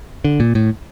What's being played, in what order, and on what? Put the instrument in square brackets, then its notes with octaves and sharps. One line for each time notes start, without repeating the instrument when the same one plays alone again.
[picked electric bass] D3
A#2
A2